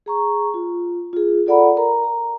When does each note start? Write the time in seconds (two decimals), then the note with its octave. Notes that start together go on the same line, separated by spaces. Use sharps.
0.06 G#4 A#5 C#6
0.54 F4
1.13 F4 G#4
1.46 F4 A4 D5 F#5 A#5 B5
1.77 A#4 A#5
2.04 A#5